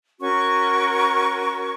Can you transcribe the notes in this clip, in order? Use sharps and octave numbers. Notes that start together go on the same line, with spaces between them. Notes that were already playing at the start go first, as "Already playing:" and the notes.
C#4 F#4 A#4 C#6